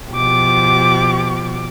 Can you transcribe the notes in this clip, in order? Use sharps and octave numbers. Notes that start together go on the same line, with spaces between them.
B2 F3 G4 D6